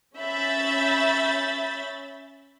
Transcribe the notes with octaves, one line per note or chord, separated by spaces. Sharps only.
C#4 E5 B5 G6 A6